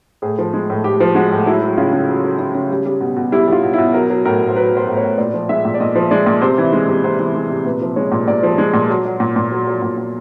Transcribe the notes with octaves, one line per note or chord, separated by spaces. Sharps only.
A2 G#4
F3
G#3
A2
A2 G4
F3
G#3 F#4
A2
F#3 E4
F#3
C#3 F4
C#3
F#3
F#3
C#3
C#3
G3
G3
B2
B2
G3 E4
G3 F4
B2
E4
B2
F#3 A#4
F#3
A2 A#4
A2
C5
F#3 B4
F#3
C5
A2
C#5
A2
A#2 D5
F3
G#3 E5
A#2
D5
A#2 D#5
F3
G#3 D5
A#2
C3 C5
E3
G#3
C3
C3 C5
E3
G#3
C3
A#2 B4
F3
G#3 C#5
A#2
A#2 D5
F3
G#3
A#2
F#3
F#3
A#2
A#2
F#3
F#3
A#2
A#2